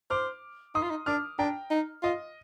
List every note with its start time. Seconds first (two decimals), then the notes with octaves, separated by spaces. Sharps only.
0.10 C5 D6 F6
0.75 D#4 C6 D#6
0.83 F4
0.90 D#4
1.06 D4 D6 F6
1.39 D4 G5 A#5
1.71 D#4
2.03 F4 D#5